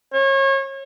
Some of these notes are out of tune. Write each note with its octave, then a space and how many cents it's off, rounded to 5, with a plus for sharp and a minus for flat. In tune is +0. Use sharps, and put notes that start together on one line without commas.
C#5 -30